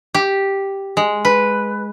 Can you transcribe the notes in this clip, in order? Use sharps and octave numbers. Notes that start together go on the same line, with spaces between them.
G4
G#3
B4